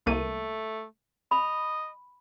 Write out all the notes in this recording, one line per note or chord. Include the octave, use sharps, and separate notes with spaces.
C2 A3 A#3 D#7
D#5 B5